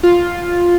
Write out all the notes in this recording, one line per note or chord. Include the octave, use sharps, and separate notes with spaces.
F4